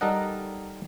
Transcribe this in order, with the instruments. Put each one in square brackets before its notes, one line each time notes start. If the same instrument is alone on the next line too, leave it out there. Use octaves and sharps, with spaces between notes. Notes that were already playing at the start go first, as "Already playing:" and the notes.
[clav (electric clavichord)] G3 D#4 A4 A#4 D#5 F#5